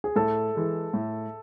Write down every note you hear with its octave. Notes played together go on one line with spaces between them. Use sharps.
G#4
A2 A4
E3 G#3
A2